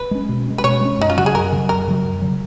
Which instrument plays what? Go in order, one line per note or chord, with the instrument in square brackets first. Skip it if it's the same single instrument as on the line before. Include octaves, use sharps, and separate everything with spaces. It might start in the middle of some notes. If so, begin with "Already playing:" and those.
Already playing: [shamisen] B4
[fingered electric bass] G#3 C#4
B2
G#3 C#4
[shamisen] B4
[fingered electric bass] B2 [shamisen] C#5
[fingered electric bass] G#3 C#4
[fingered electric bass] F#2 [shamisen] D#4
[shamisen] F4
[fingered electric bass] C#3 F#3 [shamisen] F#4
[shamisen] G#4
[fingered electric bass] F#2 [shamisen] A#4
[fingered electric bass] C#3 F#3
[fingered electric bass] F#2 [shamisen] A#4
[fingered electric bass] C#3 F#3
F#2
C#3 F#3